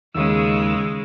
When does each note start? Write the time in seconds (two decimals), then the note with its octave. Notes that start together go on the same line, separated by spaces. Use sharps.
0.15 D#2 C#3 G#3 E6